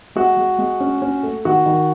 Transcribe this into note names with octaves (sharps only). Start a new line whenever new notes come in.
G#3 F#4
G#3
G#3
C#4
C#4
A3
D#3 F#4
D#3